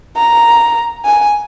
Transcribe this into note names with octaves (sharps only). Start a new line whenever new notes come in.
A#5
G#5